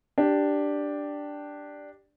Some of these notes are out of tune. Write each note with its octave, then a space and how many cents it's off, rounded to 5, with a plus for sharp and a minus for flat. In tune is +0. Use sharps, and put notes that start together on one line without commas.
D4 +0 G4 +0